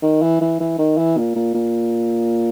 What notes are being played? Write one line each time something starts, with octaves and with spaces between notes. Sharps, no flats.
D#3
E3
E3
E3
D#3
E3
A#2
A#2
A#2